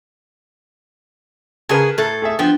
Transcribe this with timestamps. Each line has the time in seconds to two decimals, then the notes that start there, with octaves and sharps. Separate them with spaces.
1.69 C#3 G#4 A#4 B4 A5
1.98 A2 A4
2.22 A3 G#4 E5
2.39 F3 B3 D4 G5